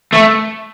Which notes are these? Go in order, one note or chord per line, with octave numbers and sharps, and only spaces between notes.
A3